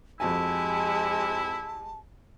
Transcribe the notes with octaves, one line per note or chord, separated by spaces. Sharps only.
F2 G#3 E4 F#4 G4 G#5 A5